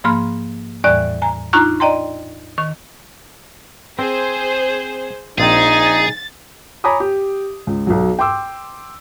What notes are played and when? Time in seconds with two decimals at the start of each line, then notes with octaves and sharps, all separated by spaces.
0.04 G#2 F3 A#3 B5 C6 F6
0.84 E2 A2 E3 G3 D5 F#6
1.22 G#5 A#5
1.53 D4 D#4 F4 A#5 C#6 F#6
1.80 D5 D#5 G5 A#5 C6
2.58 D#3 C#6
3.99 C4 G#4 C5
5.38 A#1 C4 D#4 G#4 G5 A6
6.84 C#5 G#5 A#5 B5 D6 D#6
7.00 G4
7.67 C#2
7.87 B1 F#3
8.19 G5 C6 D6 E6